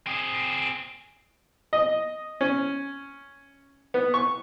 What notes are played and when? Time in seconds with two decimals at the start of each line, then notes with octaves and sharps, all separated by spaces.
0.07 C4 G#4
1.73 D#5
2.41 C#4
3.94 B3
4.14 C#6